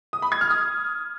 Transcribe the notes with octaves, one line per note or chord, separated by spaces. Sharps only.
D#6
B5
G#6
F6
D#6